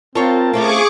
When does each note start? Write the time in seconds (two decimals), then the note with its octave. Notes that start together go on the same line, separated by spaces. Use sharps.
0.15 C4 F4 A#4 C#5 A5
0.54 A3 C4 C#4 F4 G#4 C#6 D6